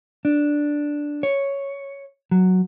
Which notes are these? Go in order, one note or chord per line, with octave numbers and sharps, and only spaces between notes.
D4
C#5
F#3